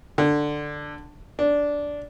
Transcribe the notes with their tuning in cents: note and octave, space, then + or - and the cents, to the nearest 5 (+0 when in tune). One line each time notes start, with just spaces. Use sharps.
D3 +10
D4 -10